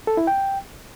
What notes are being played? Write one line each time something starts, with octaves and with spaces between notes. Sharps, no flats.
A4
E4
G5